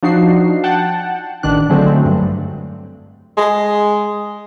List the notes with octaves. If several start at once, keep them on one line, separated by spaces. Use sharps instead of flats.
F3 D4 D#4 F#4 C7
F#5 G5 A5
A1 D#3 D4 F#6
D3 F#3 G#3 A3 C4
G2
G#3